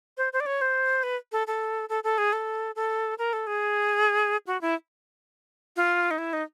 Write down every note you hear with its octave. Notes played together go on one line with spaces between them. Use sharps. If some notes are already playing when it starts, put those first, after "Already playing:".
C5
C5
D5
C#5
C5
B4
A4
A4
A4
A4
G#4
A4
A4
A#4
A4
G#4
F#4
E4
F4
D#4
E4
D#4